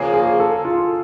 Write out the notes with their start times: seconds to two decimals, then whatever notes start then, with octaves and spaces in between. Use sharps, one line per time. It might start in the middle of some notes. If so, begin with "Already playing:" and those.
Already playing: C#3 F3 A#3 G#4
0.14 G#4
0.39 A4
0.65 F4